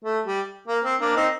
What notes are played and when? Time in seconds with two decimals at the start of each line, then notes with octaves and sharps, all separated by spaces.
0.04 A3
0.26 G3
0.68 A#3
0.84 C4
1.00 A#3 D4
1.16 C4 D#4